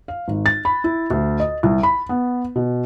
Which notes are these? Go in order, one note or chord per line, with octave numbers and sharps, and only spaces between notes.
F5
G#1
A6
B5
E4
D2
D#5
C2
B5
B3
B2